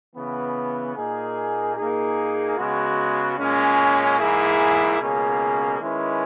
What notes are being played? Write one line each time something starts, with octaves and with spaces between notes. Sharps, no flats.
C#3 E3 B3
A#2 A#3 D#4 G#4
A#2 A#3 D#4 G#4
C#3 G#3 B3 F#4
A#2 G#3 C#4
G#2 E3 A#3 E4 G#4
C#2 B2 A#3 C#4 G#4
D#3 G#3 C#4 E4 B4